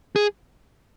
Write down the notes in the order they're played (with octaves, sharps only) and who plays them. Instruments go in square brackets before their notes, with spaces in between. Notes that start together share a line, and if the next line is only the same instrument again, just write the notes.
[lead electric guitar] G#4